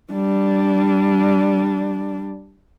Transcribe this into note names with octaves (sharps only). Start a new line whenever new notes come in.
G3 D4